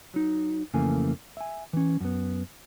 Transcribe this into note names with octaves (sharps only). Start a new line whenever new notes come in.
F#3 D#4
F2 C#3 E3 A3 A#3 G#5
E5 G#5
E3 C#4
F#2 B3